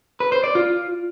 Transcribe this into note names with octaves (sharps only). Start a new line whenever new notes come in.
B4
C5
D5
F4